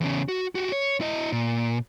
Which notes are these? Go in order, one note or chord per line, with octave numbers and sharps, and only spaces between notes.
E2 C#3
F#4
F#4 G4
C#5
E4 D#5
A#2